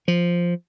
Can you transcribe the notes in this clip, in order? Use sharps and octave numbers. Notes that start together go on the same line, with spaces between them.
F3